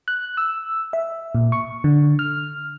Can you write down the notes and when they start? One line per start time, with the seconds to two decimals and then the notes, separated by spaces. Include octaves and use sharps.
0.08 F#6
0.37 E6
0.93 E5
1.35 A#2
1.52 C#6
1.84 D3
2.19 F6